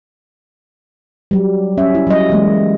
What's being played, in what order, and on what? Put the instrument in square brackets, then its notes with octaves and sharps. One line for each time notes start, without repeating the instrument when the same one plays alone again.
[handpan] F#3 G3
C#4 C#5 E5
E4
F#3 G3 D#5
E3 G#3 A#3